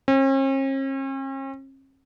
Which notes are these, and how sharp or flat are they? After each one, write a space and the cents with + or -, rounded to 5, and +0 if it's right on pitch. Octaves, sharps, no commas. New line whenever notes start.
C#4 -45